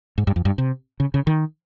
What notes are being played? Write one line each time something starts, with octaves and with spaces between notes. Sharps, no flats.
G#2
G2
F2
G2
C3
C#3
C#3
D#3